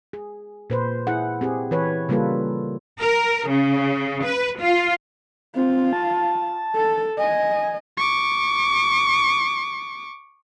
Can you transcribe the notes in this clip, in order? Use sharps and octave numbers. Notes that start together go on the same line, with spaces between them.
G#4
A#2 B4 C5
E4 G#4 F#5
C4 G4 G#4
E3 B4 C#5
C#3 G3 A#3 F4 A4 B4
A#4
C#3
B4
F4
C4 F4
A5
A4
D#5 G#5
C#6 D6